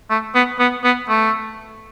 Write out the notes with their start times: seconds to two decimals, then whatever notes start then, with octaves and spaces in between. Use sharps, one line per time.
0.10 A3
0.35 B3
0.59 B3
0.84 B3
1.09 A3